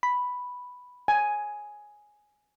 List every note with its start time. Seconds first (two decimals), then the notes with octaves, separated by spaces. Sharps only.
0.03 B5
1.08 G#5